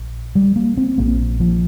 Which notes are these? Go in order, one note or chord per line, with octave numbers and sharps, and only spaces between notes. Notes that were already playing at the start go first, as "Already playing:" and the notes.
Already playing: A#1
G3
A#3
C4
A#1 A#2 A#3
F3